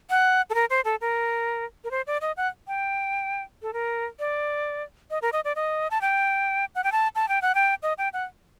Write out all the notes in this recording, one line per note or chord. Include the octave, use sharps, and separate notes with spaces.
F#5
A4
A#4
C5
A4
A#4
A#4
C5
D5
D#5
F#5
G5
A4
A#4
D5
D#5
A#4
D#5
D5
D#5
A5
G5
F#5
G5
A5
A5
G5
F#5
G5
D#5
G5
F#5